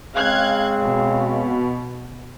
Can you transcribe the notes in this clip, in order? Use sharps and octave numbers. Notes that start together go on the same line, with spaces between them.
C#3 G#3 C4 F5 F#6 G#6
B2